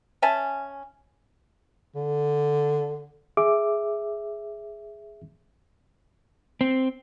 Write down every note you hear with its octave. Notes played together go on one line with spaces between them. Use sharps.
C#4 E5 G#5 A5
D3
G#4 E5 D6
C4